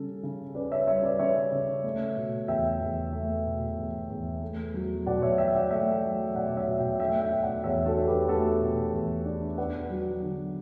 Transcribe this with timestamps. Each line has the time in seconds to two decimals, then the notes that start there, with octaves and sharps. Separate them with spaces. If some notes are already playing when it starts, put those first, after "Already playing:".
Already playing: C#3 G3 C#4 A4
0.23 C#3
0.55 C#4 B4 D5
0.71 C#5 E5
0.87 G3 C#5 E5
1.04 B4 D5
1.19 C#3 C#5 E5
1.52 C#3
1.84 A3
2.16 B2
2.48 E2 E5 G5
2.81 E2
3.12 A3
3.45 B2
3.78 E2
4.10 E2
4.41 A3
4.74 F#3
5.06 B2 D5 F#5
5.22 C#5 E5
5.38 B2 E5 G5
5.55 D5 F#5
5.70 A3 E5 G5
6.03 F#3
6.35 B2 D5 F#5
6.47 D5
6.57 C#5 E5
6.67 B2
6.78 E5 G5
6.99 A3 E5 G5
7.21 E5 G5
7.32 B2
7.42 D5 F#5
7.64 E2 C#5 E5
7.86 F#4 A4
7.97 D4
8.07 G4 B4
8.28 A3 F#4 A4
8.61 B2
8.93 E2
9.25 D4
9.58 B3 D5 F#5
9.90 F#3
10.22 D3